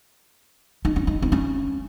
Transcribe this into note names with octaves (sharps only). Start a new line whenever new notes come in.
D#4
C#4
D#4
C4
C#4